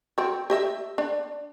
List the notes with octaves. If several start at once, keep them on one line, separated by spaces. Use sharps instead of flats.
C4 F#4
G4 D#5 E5
D4